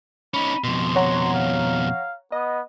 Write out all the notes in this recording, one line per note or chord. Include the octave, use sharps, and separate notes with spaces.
C#4 D#4 B5
F2 B2 C6
C#5 F#5 A#5
F5
B3 D#5